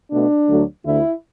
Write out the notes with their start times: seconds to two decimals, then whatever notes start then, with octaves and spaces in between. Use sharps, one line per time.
0.09 B2 A3 D4
0.48 D2 D3 F#3 A3
0.85 D2 D3 A3 E4